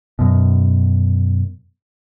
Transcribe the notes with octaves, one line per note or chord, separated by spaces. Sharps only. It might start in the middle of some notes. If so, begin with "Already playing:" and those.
F#2 B2